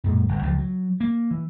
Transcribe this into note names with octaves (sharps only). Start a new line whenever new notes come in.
F#2 A#2 G#3
G1
C#2 F3
F#3
A#3
E3